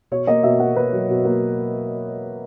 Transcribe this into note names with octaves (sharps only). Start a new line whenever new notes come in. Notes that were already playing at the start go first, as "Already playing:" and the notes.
B2 C#5
A#3 D#5
B2 E5
A#3 F#5
B2 B4
F#3
B2
A#3